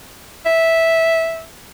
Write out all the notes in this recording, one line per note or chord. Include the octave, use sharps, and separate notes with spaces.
E5